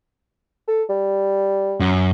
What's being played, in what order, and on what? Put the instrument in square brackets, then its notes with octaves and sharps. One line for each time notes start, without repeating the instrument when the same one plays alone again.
[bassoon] A4
G3
[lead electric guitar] F#2